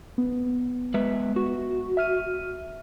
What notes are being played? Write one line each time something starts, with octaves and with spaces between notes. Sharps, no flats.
B3
G#3 B4 E5
F#4
E5 F6 D#7